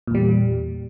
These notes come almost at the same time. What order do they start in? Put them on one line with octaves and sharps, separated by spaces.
A#2 E2 G3